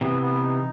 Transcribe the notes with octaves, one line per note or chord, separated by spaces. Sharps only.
C3 E3 B3
B3
D#4